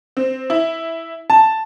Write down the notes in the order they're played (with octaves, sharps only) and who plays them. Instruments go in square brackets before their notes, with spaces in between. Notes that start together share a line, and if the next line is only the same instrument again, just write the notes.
[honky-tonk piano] C4
E4
A5